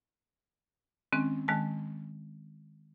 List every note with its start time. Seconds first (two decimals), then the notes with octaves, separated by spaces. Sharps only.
1.12 D#3 G#3 C4 C#4
1.48 D#3 G#3 A5